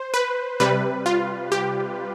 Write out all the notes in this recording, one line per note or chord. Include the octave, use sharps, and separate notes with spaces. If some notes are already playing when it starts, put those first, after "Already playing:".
Already playing: C5
B4
C3 G3 B4
F4
G4